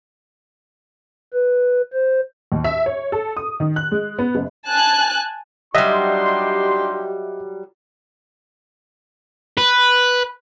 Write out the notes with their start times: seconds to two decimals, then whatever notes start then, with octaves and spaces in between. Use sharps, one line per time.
1.33 B4
1.93 C5
2.52 D#2
2.64 E5
2.86 C#5
3.12 A4
3.37 D#6
3.60 D#3
3.76 F#6
3.91 G#3
4.19 B3
4.35 F#1
4.68 G#5 A5 F#6
5.75 F#3 G3 D4 D#4 G4 D#5 E5 C6
9.57 B4